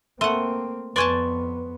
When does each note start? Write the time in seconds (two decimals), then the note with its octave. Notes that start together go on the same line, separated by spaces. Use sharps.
0.21 A3 A#3 C4 F#5 C6 D#7
0.96 F2 B3 B4 D5 G#5 A5 C6 C#6